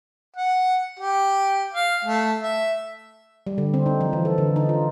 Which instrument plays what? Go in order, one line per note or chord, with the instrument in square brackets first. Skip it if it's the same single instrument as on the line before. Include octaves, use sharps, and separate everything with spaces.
[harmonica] F#5
G4
F5
A3
E5
[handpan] G3
D3
C4
D#4
F3
E3
A4
D3
D#4
F4